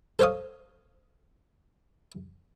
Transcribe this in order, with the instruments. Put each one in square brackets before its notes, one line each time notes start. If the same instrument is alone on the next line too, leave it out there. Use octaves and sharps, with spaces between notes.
[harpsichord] A4 C5 C#5 F5 D#6